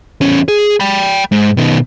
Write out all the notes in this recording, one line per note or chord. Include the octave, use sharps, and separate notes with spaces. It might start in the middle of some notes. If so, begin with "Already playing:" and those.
E2 C#4
G#4
G5 B5
G#2
B2 D#3